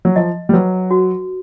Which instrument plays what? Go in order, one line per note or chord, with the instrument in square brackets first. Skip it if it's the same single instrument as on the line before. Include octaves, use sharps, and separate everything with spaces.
[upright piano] F#3
[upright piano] F3 [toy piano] D#5
[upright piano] G3
[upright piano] F#3 [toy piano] B4
[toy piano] F#4